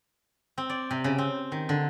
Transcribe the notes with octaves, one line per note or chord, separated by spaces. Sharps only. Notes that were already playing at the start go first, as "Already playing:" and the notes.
C4
D5
C3
C#3
C4
D#3
D3